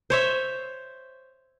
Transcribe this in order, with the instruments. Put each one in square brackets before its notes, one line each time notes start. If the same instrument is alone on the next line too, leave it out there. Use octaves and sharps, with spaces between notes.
[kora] C5 C#5 E5